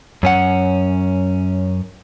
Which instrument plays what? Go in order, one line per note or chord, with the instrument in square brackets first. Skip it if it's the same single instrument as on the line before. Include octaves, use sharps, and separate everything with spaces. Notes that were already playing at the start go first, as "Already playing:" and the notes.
[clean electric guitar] F#2 C#4 F#5